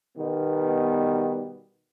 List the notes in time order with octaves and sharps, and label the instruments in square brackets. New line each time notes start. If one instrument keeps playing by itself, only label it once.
[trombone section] B2 D#3 G3 B3